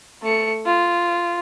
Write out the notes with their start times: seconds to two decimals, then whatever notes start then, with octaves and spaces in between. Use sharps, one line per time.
0.22 A3 C#7
0.66 F4